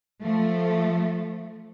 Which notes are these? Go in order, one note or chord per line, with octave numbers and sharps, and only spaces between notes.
F3 A3